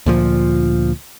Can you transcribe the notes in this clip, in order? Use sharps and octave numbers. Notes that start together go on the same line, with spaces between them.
D2 A#2 F3